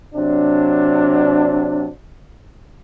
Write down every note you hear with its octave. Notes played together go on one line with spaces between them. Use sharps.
C3 F#3 D4